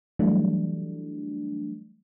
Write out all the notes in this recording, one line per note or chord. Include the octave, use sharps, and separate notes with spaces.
E3 F#3 G3 A3 D4